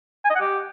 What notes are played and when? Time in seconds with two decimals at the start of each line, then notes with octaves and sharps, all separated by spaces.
0.25 G#5
0.30 D#5
0.35 F#5
0.41 G4